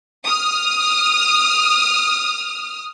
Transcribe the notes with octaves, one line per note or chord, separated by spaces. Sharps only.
D#6 F6